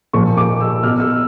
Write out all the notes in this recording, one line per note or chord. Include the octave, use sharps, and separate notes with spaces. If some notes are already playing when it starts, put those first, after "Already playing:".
A#2 F3 C#6
D6
E6
B2 F6
E6